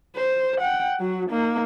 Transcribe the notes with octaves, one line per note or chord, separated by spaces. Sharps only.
C5
F#5 G5
F#3 F#4
A#3 D#4